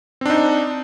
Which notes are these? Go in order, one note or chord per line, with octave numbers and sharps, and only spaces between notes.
C4 D4 D#4